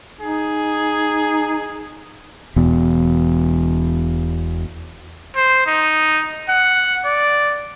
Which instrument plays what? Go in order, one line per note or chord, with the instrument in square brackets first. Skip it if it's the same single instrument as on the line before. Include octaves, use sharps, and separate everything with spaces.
[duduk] D#4 [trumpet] G#4
[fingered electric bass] E1 E2 B2
[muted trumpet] C5
D#4
F#5
D5